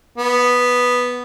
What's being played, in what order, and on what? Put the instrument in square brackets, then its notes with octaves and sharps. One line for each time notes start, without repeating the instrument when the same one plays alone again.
[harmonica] B3